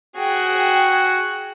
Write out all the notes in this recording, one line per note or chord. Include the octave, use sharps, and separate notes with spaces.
F#4 G#4 G5